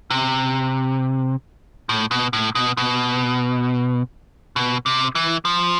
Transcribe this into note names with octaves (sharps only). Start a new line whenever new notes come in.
C3
A2
B2
A2
B2
B2
B2
C3
E3
F3